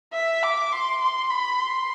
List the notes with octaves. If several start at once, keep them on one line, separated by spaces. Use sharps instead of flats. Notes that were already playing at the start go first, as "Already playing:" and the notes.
E5
D6
C6
C6
B5
C6